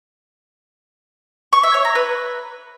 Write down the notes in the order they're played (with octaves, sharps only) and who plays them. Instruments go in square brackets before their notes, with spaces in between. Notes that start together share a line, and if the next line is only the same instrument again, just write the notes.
[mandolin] C#6
E5
C#5
A#5
B4